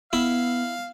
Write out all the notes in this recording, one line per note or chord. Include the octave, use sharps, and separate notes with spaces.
B3 E4 F5